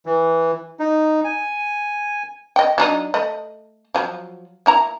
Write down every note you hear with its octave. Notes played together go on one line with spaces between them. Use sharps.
E3
D#4
G#5
D#5 G5
F#3 D4 D#4
A3 D#5
F3 F#3
A#3 E4 A#5